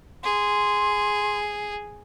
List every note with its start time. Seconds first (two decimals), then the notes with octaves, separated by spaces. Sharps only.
0.24 G#4 C6